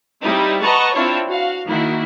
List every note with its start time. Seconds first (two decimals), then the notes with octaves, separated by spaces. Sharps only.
0.23 G3 C4 D#4 E4
0.61 B4 D#5 F#5 A5 A#5 C#6
0.94 C4 D4 E4 F4 C#5
1.27 F#4 F5
1.66 D#3 A#3 E4 F#4